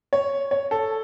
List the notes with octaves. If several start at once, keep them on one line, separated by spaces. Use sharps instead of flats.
C#5
C#5
A4